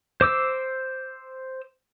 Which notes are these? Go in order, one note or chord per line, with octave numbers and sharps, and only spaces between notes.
C5 D6 E6